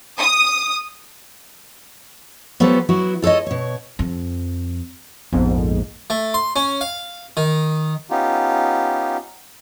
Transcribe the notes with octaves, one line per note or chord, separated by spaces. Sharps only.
D#6
F#3 B3 F4 G4 A4 C5
F#3 B3 E4 F#4
F4 A4 C5 C#5 D#5
B2 C#5
F2
A#1 F2 G#2 B3
A3
C6
C#4
F5
D#3
B3 C#4 D#4 F4 G4